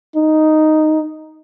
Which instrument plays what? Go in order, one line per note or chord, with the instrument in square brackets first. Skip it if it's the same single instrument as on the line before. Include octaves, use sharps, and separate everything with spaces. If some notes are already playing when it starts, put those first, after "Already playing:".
[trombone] D#4